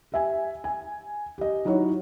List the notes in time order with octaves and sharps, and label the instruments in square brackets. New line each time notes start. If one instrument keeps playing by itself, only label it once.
[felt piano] G4 E5 G#5
G#5
G4 D#5
F#3 D#4 E4 F#4 C#5